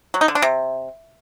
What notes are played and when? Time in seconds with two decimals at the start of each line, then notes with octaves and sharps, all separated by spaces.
0.14 F#3
0.21 D#4
0.28 D3
0.35 D4
0.42 C3